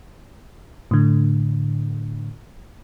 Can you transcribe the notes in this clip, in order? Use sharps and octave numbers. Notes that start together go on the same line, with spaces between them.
A2 D3